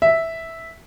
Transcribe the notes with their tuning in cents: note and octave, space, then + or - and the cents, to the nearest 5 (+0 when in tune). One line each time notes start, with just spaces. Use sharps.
E5 -5